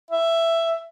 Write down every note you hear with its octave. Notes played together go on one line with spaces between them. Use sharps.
E5